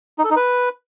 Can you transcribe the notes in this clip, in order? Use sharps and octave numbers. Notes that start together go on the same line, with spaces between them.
D#4
A4
D#4
B4